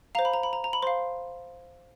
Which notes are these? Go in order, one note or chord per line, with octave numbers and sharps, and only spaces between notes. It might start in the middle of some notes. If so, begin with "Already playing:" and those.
C5 F5 A#5
B5
A#5
B5
A#5
A#5
B5
C5 F5 C6